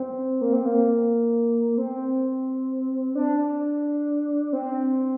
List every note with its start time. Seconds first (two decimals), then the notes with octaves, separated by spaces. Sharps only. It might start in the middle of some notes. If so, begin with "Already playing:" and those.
Already playing: C4
0.41 A#3
0.53 C4
0.65 A#3
1.78 C4
3.15 D4
4.53 C4